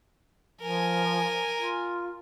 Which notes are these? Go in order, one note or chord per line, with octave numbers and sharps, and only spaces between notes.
F3 A#4 G#5
F4